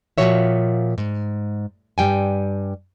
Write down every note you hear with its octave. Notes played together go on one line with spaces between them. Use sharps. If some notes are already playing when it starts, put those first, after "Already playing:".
A#2 C#3 F3 F#4 C#5 E5
G#2
G2 G3 G5 G#5